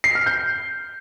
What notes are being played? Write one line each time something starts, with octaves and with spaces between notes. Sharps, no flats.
C7
F6
G6